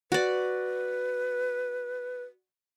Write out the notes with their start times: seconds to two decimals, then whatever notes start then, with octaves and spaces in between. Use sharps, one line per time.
0.12 F#4 B4 D5